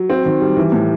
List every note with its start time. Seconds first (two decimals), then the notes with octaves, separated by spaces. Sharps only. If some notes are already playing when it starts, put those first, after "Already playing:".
Already playing: F#3
0.10 C4
0.26 D#3
0.41 G3
0.57 E3
0.72 A2